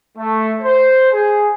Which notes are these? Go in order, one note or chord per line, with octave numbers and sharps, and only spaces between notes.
A3
C5
G#4